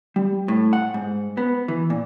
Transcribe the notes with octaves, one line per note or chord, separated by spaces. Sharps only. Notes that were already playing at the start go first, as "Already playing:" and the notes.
G3
A2
F#5
G#2
B3
E3
A#2